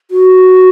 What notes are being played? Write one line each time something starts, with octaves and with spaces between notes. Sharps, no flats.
F#4